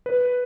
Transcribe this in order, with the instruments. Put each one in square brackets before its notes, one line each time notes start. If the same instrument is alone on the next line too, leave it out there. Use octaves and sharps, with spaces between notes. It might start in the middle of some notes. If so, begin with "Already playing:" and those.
[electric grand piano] B4